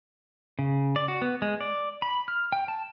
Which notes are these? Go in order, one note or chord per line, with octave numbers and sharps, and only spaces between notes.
C#3
D5
F#4
B3
G#3
D5
B5
F6
G5
A5